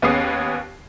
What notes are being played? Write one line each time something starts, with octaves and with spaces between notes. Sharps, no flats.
D#2 B3 C#4 G#4 D#6 C7